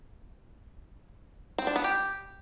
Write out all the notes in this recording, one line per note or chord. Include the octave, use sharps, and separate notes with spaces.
C4
D4
B3
G4